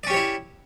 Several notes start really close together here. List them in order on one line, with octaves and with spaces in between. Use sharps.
D5 C#4 G4 C#5 E4